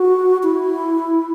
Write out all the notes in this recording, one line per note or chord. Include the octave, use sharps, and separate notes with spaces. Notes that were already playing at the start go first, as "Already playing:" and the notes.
Already playing: F#4
E4